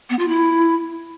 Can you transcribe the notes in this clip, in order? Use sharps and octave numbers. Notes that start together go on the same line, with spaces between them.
B3
F4
E4